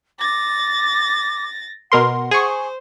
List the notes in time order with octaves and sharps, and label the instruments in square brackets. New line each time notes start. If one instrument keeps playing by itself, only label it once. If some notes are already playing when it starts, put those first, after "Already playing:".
[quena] D6 [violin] A6 A#6
[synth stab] B2 A#4 C6 [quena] F#5
[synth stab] G#4 C#6 [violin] C5